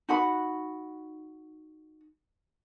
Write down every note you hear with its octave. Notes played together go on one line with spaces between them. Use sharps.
D#4 F#4 F#5 B5